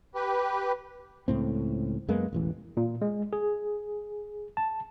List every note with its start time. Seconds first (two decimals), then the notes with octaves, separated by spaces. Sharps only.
0.15 G4 B4
1.28 C#2 A2 C4
2.08 F#2 G#3 A#3 B3
2.33 E1 A1 E3
2.77 A#2
3.02 G#3
3.33 G#4
4.57 A5